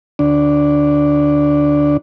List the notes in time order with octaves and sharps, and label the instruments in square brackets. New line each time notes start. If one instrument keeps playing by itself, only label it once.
[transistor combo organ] D2 D4